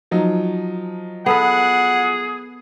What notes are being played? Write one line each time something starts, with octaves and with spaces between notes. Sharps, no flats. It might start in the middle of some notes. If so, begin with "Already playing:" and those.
F3 F#3 D#4
B3 G#4 A4 B4 F#5